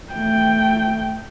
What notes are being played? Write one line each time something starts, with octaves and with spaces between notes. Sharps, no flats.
A3 G5